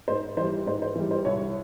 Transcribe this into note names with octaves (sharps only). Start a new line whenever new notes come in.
G#2 C5
E3 G3 C5
G#2 C5
C5
E3 G3
C5
C2 C#5